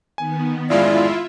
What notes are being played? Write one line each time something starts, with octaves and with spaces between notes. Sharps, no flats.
D#3 B3 G#5
A1 F#2 G#3 E4 F4 D5 E5